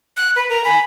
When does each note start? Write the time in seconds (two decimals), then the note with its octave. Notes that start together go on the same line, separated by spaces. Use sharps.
0.17 F#6
0.36 B4
0.50 A#4 A#5
0.64 G#5 B5